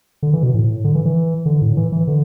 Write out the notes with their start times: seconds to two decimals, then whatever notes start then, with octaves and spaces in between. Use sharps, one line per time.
0.23 D3
0.33 E3
0.43 B2
0.54 A2
0.84 D3
0.95 E3
1.05 E3
1.46 D3
1.62 A2
1.77 E3
1.92 E3
2.07 D3